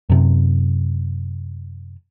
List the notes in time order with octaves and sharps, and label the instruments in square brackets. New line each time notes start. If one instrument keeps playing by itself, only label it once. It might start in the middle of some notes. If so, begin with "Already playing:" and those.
[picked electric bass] F#2 C3